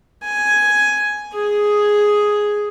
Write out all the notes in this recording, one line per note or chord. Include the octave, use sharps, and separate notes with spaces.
G#5
G#4